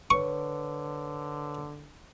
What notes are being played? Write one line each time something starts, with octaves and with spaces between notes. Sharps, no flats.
D3 B4 C#5 C#6